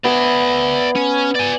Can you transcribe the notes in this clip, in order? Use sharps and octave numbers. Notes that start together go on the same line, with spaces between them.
B3 G#4 D5 E5
C#4
D5 G#5